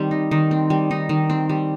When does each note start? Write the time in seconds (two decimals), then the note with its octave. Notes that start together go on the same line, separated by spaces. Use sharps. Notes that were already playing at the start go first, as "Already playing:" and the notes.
Already playing: D#3 G3 C4
0.11 D#4
0.31 D#3
0.51 C4
0.70 G3
0.91 D#4
1.09 D#3
1.30 C4
1.49 G3